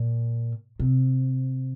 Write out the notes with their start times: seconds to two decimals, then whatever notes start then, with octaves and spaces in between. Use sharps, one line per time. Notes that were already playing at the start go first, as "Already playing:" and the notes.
Already playing: A#2
0.80 C3